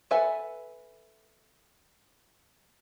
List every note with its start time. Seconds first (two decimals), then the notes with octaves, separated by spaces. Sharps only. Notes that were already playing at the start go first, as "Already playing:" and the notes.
0.11 A4 B4 E5 F#5 G#5